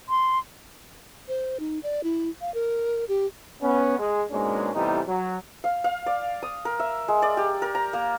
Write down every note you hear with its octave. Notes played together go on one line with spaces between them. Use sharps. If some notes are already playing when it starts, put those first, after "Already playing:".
C6
C5
D#4
D5
E4
F5
A#4
G4
B3 C#4
G#3
G#2 B2 G#3 A#3 C#4 D4
A2 C3 E3 G3 B3 D#4
F#3
F5
F5
D5
D#6
A#4
E5
G#3
D5
G4
A#4
A#5
A#3